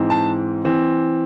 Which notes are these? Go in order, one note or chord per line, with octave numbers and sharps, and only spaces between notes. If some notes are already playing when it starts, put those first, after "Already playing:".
Already playing: G#2 E3 C4
A5
E3 C4